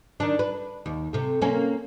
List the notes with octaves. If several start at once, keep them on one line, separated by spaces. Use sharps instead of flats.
D#3 D4
B4
D#2
C3 A3
A#3 C4 C#4